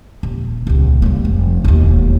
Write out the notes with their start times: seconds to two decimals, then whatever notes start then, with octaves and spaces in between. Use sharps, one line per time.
0.23 D#1
0.67 D#1 C#2
1.02 G3 A#3
1.25 F1
1.64 E1 D#2